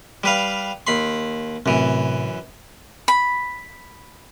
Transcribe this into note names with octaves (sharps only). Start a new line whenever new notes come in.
G3 B4 F5
D#2 B5 C6
F#2 A2 C3 E3
B5